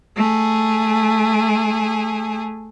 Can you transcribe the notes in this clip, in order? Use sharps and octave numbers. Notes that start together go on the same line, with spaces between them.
A3 G#4